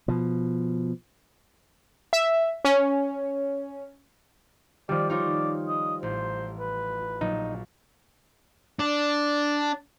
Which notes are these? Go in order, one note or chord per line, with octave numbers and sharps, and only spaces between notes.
B2 F3
E5
C#4
D#3 F3 G3 D5
D#4 F4 C#5 D5
D#5
A1 C5
B4
A#1 F#3 D#4
D4